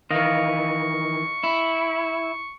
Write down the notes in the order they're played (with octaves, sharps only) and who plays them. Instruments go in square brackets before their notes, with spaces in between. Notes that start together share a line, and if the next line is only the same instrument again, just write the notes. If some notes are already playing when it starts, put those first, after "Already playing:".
[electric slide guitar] D#3 E3 [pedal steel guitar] D#5 F5 [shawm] C#6
[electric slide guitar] E4